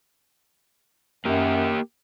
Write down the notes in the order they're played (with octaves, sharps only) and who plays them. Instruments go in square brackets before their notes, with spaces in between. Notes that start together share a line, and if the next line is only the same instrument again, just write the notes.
[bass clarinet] F#2 [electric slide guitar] A#3 G4